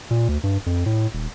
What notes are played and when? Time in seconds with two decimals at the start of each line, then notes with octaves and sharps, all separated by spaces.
0.11 A#2
0.29 D2
0.43 G2
0.66 F2
0.86 A2
1.13 D#1